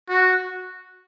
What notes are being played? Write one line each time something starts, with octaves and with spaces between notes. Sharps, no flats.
F#4